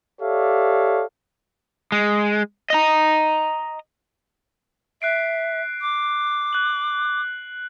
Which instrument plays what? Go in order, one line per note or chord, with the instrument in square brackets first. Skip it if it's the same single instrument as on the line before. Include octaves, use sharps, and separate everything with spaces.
[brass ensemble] G4 A4 C#5 D5 E5 F5
[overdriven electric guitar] G#3
D#5 A#5
[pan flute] E5 [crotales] F#6 C7 D7
[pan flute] D6
[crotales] F#6 F#7